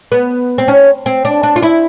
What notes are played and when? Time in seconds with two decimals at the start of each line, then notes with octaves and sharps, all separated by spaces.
0.12 B3
0.58 C4
0.68 C#4
1.06 C4
1.25 D4
1.43 D4
1.56 F4
1.62 E4